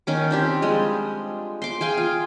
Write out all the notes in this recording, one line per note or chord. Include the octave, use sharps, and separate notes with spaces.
D#3 C#4 D6
C4 D4 G4
F3 G3 G#3
C6 D6
G#4 F5 G5 G#5
F4